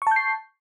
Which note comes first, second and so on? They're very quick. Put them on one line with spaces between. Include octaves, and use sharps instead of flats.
C#6 A5 G6 C7